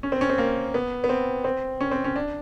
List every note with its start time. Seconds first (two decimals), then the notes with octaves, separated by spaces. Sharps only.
0.03 C#4
0.12 C4
0.21 C#4
0.29 C4
0.38 A#3
0.74 B3
1.04 B3
1.09 C4
1.44 C4
1.81 C#4
1.91 C4
2.04 C#4
2.16 D4